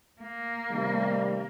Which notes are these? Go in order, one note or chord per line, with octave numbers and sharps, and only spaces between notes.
A#3
C3 D#3 G3